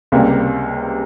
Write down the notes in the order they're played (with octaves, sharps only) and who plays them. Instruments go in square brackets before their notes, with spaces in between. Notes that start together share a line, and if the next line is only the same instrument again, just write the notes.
[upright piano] C#2 C3 G3 A#3